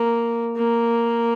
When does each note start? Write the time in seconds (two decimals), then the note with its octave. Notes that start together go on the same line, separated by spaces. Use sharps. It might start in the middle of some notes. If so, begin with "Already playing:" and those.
Already playing: A#3
0.57 A#3